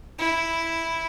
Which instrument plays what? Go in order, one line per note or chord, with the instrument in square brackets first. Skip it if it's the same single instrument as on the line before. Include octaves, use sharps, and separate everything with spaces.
[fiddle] E4